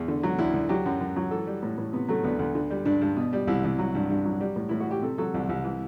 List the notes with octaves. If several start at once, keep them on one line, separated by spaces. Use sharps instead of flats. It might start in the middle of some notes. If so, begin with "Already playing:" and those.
Already playing: E2
D3
F#3
D2 E4
D2
F#3 G4
F#2
F#2
F#3
E3 A4
G3
A2
A2
C3 B3
F#3 A3
D2 B3
D2
D3
G3
G2 D4
G2
B2
G3
C2 E4
C2
F#3
G2
G2
F#3
G3
A2
A2 E4
F#4
G3 G4
C3 A4
F#3 A4
C2
C2
E3